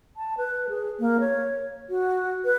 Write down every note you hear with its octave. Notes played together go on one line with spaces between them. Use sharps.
A5
B4
G#4
A#3
C#5
F#4
B4